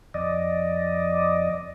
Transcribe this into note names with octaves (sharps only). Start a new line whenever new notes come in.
F2 D5 D#5